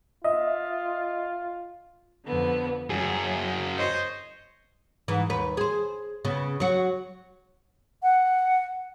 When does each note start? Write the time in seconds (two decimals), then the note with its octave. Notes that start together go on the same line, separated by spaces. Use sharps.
0.24 F4 D#5 E5
2.26 F2 D3 B3
2.90 F#2 F#3 G#4
3.77 C5 C#5 D#5
5.08 G#2 E3
5.30 D#2 B4
5.57 G#4 C5
6.25 C#3 B3
6.60 F#3 F#4
8.03 F#5